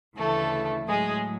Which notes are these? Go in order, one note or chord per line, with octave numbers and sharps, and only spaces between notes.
D2 C#3 E3 A3 A4
A2 F#3 G#3 G#4